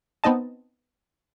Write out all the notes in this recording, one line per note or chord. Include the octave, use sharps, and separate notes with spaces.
B3 C4 D#4 D#5 A5